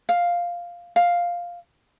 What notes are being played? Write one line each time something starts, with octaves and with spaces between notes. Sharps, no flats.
F5
F5